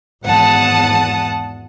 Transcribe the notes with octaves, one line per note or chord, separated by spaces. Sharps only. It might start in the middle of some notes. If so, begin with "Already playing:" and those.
G#1 E2 F#5 A5 D#6